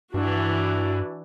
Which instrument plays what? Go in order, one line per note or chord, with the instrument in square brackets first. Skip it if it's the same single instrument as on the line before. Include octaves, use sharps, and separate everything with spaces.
[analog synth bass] G2 [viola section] E3 D4 F#4